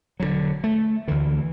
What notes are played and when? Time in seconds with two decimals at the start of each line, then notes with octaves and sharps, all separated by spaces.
0.20 E1 D2 D3 F#3
0.64 A3
1.08 D2 D3 E3